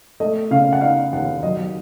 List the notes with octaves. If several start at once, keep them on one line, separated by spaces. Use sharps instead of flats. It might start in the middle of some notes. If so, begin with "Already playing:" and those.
A3 D#5
C#3 F5
F#5
D#4 F5
D#2 F#5
F#3 D#5